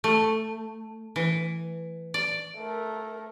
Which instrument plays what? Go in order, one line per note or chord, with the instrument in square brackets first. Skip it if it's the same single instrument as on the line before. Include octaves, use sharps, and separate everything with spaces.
[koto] A3
E3
D5
[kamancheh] A3 A#4